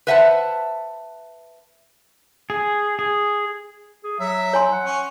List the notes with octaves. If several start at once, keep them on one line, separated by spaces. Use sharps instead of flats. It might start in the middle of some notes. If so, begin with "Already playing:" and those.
B4 C5 E5 F#5 G5 A5
G#4
G#4
G#4
F#3 E5
C#5 G#5 C6
F#5
C#4